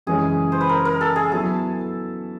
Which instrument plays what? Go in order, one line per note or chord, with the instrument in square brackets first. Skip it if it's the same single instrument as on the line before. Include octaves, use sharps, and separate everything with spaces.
[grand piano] F#2 C#3 E3 G#3 C#4 [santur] G#4
[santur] C5
B4
A#4
A#4
A4
G#4
[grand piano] F#3 B3 E4 [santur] A4